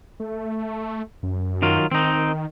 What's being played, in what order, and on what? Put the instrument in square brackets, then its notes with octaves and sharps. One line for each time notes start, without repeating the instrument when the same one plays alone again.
[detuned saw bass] A3
F#2
[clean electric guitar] D#3 F#3 F4
[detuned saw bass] D#3 [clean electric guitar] C4 D#4